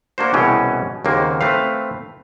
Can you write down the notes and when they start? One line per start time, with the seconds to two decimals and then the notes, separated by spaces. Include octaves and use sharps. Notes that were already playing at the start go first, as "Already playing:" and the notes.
0.18 A#3 D4 F#4 C5
0.34 C2 B2 E3 C#4 G#4 G5
1.05 D#2 C#3 A#3 C4 F#4
1.41 A3 C4 B4 F5